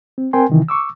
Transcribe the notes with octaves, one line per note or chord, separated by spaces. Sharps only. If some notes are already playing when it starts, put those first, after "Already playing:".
C4
C4 A#4 G5 G#5 C6
C3 D#3 E3
C#6 D6 E6